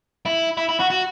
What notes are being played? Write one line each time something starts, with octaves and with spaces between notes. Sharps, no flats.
E4
E4
E4
F#4
F#4